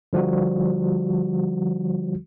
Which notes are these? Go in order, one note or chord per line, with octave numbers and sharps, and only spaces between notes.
D3 F3 G3 F#4